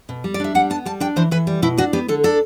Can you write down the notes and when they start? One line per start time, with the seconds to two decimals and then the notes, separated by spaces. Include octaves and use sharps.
0.09 B2
0.24 G3
0.34 D5
0.40 D4 E5
0.55 G3 F#5
0.70 B3 A5
0.85 G3 A5
1.00 D4 G5
1.16 E3 C5
1.31 E3 B4
1.47 G3
1.62 B2 E4
1.77 D4 F#4
1.93 B3 G4
2.08 D3 A4
2.24 D4 A4